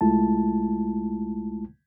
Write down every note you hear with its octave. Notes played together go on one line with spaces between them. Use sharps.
C2 G#3 A3 E4 F4 A5